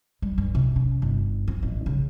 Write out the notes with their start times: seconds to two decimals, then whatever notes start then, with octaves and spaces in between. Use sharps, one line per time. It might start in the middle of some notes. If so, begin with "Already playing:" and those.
0.22 G3
0.38 G2
0.55 C3
0.76 C#4
1.02 G1
1.48 C4
1.63 A1
1.86 C#3